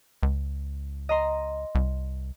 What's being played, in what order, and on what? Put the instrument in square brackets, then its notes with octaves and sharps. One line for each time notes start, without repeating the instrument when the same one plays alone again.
[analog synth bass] C#2
[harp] D#5 A#5 C6
[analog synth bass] C2